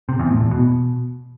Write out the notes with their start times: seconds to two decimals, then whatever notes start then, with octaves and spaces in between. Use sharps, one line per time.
0.09 C3
0.19 E2
0.30 A2
0.41 E2
0.51 B2